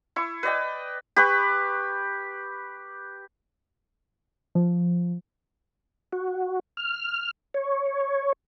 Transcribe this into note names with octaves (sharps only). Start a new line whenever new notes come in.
E4 C#6
B4 D5 D#5 G5
G4 B4 C#6
F3
F#4
F6
C#5